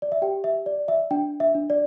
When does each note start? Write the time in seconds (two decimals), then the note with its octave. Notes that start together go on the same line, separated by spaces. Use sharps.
0.02 D5
0.12 E5
0.22 G4 G5
0.44 E5
0.66 D5
0.88 E5
1.11 D4 G5
1.40 E5
1.55 D4
1.70 D5